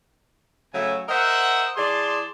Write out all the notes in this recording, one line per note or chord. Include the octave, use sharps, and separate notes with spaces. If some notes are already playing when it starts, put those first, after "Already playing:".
C#3 F#3 A3 E5 G#5
A#4 C5 D#5 E5 F#5
E3 G#4 D5 A5 C6